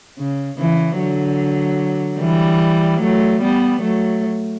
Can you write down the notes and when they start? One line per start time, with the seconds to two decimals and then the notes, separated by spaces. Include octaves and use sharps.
0.18 C#3
0.58 C#3 E3
0.99 D3 F#3
2.19 E3 G3
3.00 F#3 A3
3.41 G3 B3
3.81 F#3 A3